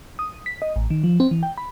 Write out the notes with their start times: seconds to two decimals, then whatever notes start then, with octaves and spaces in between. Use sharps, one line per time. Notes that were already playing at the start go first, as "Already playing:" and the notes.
0.19 D#6
0.46 B6
0.62 D#5
0.76 A1
0.90 D#3
1.04 F3
1.20 C4
1.31 E3
1.43 G5
1.58 B5